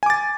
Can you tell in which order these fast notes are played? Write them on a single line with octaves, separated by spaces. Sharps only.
G#5 D6 A6